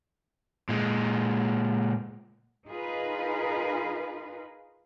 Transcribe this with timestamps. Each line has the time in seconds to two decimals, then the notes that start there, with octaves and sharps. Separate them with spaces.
0.69 A#2 G#3
2.67 D#4 F4 G#4 A#4 B4